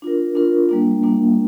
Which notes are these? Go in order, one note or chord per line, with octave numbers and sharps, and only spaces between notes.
D4 F4 A#4
D4 F4 A#4
G3 A#3 D4
G3 A#3 D4